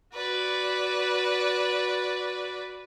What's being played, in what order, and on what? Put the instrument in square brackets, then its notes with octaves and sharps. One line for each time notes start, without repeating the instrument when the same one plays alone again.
[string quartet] F#4 B4 D5